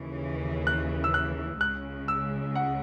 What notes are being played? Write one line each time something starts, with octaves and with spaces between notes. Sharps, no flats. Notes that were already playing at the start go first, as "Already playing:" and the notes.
Already playing: D#2 C#3 E3
F#6
E6
F#6
C#2 C#3 G#3 F#6
E6
F#5